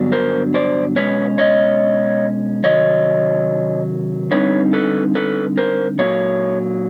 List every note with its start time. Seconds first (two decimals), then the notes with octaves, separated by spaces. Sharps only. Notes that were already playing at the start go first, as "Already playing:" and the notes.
Already playing: G2 D3 F#3 B3 D4
0.12 A#4 C5
0.54 C5 D5
0.96 B2 G#3 C#4 B4 C#5
1.38 C#5 D#5
2.64 C3 D#3 F#3 C#5 D#5
4.31 D3 G3 C4 D#4 B4 C#5
4.73 A4 B4
5.15 A4 B4
5.57 A#4 C5
5.98 A#2 F#3 A#3 C#5